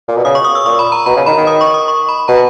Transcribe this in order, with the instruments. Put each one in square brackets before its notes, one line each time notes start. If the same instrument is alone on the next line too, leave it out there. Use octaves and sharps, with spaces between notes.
[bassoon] A#2
B2
[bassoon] C#3 [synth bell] D#6
[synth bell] C#6
D#6
E6
[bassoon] A#2 [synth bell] C#6
[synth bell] B5
A#5
[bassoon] B2 [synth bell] A#5
[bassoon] C#3
[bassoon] D#3 [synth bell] B5
[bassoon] D#3
[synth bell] D#6
C#6
D#6
C#6
B5
[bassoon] B2 [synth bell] A#5